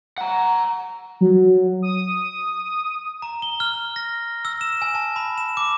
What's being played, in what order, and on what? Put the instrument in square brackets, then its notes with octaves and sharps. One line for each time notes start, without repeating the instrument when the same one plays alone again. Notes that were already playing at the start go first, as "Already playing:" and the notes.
[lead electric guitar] F#5 A#5
[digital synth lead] F#3
D#6
[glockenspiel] A#5
G7
F6
A#6
E6
E7
G#5
A5
B5
E7
D6